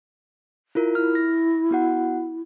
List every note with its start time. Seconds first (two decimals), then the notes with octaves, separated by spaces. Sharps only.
0.75 E4 F4 A#4
0.95 E4 F6
1.15 A#6
1.71 B3 F#4 F#5